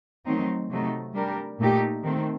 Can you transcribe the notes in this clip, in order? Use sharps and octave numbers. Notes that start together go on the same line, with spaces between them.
D#3 F#3 A3 C4 D#4
C3 F#3 A3 D#4
G3 D4 G4 A#4
A#2 A3 D#4 G4
D#3 A3 C4